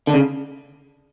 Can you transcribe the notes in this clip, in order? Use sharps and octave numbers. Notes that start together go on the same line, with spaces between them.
D3
C#3